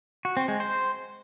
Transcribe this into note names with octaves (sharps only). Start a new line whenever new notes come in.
F#4
C4
G#3
C5